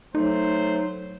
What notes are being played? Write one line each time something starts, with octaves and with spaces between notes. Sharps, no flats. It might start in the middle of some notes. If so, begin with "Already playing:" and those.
F#3 A3 D#4 C5